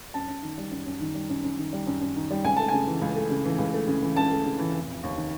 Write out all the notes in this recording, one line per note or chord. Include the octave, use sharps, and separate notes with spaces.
F#2 A5
F#2
D#3
G3
F#2
F#2
D#3
G3
F#2
F#2
D#3
G3
F#2
F#2
D#3
G3
C#2 G#5
A3 A5
G#5
C#3
E3
C#2
A3
C#3
E3
C#2
A3
C#3
E3
C#2 A5
A3
C#3
E3
F1
F1
D#2
D#3